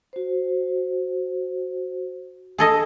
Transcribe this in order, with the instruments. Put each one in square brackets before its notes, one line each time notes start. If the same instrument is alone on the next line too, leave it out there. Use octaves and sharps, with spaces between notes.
[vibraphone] F#4 C5
[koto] G#4 A4 D#5